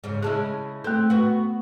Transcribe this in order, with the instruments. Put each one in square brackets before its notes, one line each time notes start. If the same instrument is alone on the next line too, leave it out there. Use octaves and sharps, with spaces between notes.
[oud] G#2 C#3
[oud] C#3 G#3 E4 [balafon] G#4 A5
[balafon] A3 A4 [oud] C4
[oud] B3 F#4